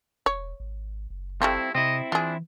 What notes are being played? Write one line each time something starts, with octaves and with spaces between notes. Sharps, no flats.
E1 C#5
G#1
F#1
G3 A3 C4 E4 F4
C3 C4 E4 D#5
E3 D4 F4 G#4